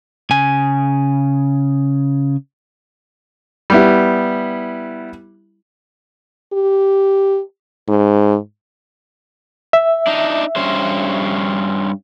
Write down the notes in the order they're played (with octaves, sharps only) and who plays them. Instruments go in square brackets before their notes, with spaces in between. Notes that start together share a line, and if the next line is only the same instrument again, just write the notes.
[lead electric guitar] C#3 G#5
[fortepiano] G3 B3 E4
[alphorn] G4
G#2
[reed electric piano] E5
[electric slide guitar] D4 D#4
G2 C#4 C5